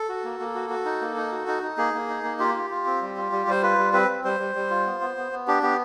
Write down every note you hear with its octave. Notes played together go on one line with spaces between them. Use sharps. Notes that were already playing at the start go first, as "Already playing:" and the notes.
Already playing: A4
F#4
A#3
A#3
F#4
F#4
D#4
A#3
D#4
F#4
D#4
D#4
A#3 G#4
A#3
D#4
A#3
F4 G4
F4
F4
C4
G3
F4
G3
G3 C5
F4 B4
G3
C4 B4
G3
G3 C5
G3
G3
F4
B3
B3
B3
B3
D4 G4
B3 G4